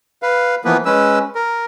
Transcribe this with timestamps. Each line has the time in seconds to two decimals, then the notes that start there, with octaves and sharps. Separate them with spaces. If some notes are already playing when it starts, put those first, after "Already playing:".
0.22 B4 F5
0.65 E3 F3 A#3 B3 B4
0.86 G#3 C#4 B4 E6
1.35 A#4